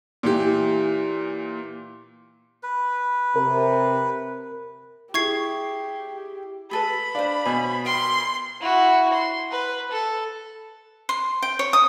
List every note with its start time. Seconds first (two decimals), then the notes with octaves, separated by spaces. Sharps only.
0.23 A#2 E3 G4
2.63 B4
3.36 C3 A#4
5.14 E4 G4 G#4 C#6 G#6 C7
6.71 G#4 A4 B4 B5
7.15 D4 C5 F5
7.45 B2 C5 C#5 G#5
7.85 A#4 E5 G5 C6
8.61 E4 F#4
9.13 C6
9.51 B4
9.91 A4
11.09 C6
11.42 G5
11.59 C#5
11.73 D#6